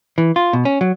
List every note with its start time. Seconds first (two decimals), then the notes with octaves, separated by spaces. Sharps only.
0.18 E3
0.36 F4
0.53 B2
0.65 C#4
0.81 F#3